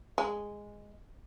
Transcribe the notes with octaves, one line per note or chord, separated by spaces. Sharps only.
G#3